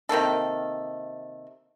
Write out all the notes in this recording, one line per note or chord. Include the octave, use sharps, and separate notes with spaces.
C3 D#3 A#3 A4